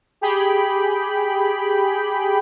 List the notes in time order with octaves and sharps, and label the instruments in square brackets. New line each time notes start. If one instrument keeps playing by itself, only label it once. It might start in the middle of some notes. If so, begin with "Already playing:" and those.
[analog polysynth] G4 G#4 G5 B5